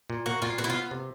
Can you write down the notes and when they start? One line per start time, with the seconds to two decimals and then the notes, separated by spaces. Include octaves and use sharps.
0.10 A#2
0.26 A#3 F#4
0.42 A#2 F4
0.58 B3 F#4
0.64 E4
0.70 F4
0.74 B3
0.91 C3